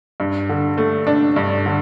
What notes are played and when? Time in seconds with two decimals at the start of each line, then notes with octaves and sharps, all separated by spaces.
0.20 G2
0.49 D3
0.78 A3
1.07 D4
1.36 G2
1.66 D3